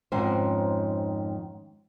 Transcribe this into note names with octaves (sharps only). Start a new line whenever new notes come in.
F2 G#2 D#3 C#4 C5